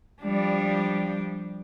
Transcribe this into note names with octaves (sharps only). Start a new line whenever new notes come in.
F3 G3 D4